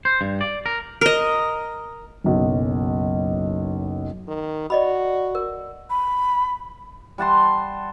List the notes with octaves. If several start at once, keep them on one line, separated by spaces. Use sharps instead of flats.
C5
G2
D5
A#4
A#4 D#5
F#1 B1
D#3
F#4 D5 D#5 B5
A#4
B5
G3 F#5 A5 C6